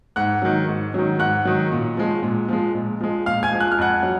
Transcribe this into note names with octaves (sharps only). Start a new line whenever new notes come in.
G#2 F#5 F#6
D#3 F#3
G#2
D#3 F#3
G#2 F#5 F#6
D#3 F#3
A#2
F3 G#3
A#2
F3 G#3
A#2
F3 G#3
A#2 F5 F6
G#5 G#6
F3 G#3
F#6
F6
F2 F#5 F#6
F#3